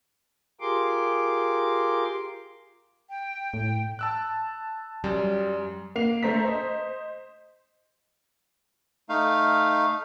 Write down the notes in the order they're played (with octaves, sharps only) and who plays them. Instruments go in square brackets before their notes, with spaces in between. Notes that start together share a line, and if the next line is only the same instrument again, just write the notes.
[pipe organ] F4 G4 G#4 A#4 C6 D6
[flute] G5
[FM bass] A2
[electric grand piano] A5 E6 F#6
[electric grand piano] F#2 [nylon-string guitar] G3
[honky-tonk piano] A#3 C7 F7
A3 C5 A#5 B6
C5 D#5
[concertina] A3 D#4 F5